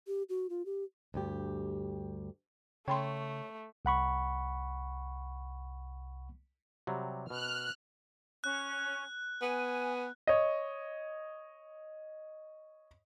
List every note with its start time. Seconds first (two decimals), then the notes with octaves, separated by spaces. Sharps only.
0.07 G4
0.29 F#4
0.49 F4
0.65 G4
1.14 D2 G2 G4
2.88 C#3 A3 C#5 G5 B5 C6
3.85 C2 F#5 B5 C#6
6.87 C3 F#3 G3
7.30 B2 F6 F#6
8.44 C#4 F#6
9.41 B3 G#5
10.27 C#5 D#5